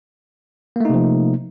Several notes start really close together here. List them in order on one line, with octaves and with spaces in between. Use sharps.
A#3 A3 D#4 C3 F3